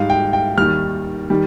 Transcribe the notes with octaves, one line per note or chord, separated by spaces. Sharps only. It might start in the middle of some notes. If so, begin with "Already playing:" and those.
Already playing: G#2 G3 F5
G5
G5
D#2 D#3 G3 F6
D#3 G3